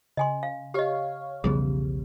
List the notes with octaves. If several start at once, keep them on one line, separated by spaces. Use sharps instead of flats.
C#3 D#5 G#5 C6
F5
G4 C#5 D#5 F5
B1 E2 C#3 F3 G3 B3 G#4